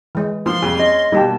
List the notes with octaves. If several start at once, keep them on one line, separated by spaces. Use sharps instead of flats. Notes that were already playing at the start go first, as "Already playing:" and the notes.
E3 G#3
F3 A#3 C6
F2 G3 G#4
C#4 D#5
B2 D#3 G3 A#3 D#4 G4 A5